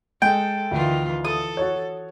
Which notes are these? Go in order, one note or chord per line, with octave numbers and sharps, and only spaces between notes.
G#3 A4 G5
D2 D#3 E3 F4
A4 D#6
F#4 C#5